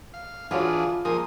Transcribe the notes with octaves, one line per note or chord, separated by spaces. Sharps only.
F5
E3 D4 F4 F#4 G#4 C#5
F3 A#3 D#4 G#4 D#6